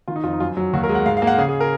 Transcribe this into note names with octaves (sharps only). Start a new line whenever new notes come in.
D#3 F4
D#4
F2 F4
D#4
F#2 F4
F#3
D#2 F#4
A#4
G#3
F#5
G#2 F5
F5
A#3
F#5
C#3 G#4
G#4
A#4